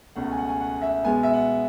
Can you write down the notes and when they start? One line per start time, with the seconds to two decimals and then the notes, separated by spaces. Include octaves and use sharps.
0.16 C#2 B2 A3 C#4 F#5
0.31 G#5
0.37 F#5
0.49 G#5
0.60 F#5
0.82 E5
1.04 B2 G#3 B3 G#5
1.23 E5
1.33 F#5